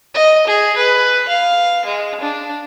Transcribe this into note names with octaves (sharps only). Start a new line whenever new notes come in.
D#5
G#4
B4
F5
G#3
D4